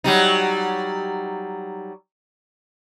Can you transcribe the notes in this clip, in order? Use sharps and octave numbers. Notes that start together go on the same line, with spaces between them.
F#3 G3 D#4